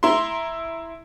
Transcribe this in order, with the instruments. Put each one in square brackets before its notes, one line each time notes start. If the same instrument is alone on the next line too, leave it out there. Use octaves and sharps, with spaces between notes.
[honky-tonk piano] E4 A#5 C6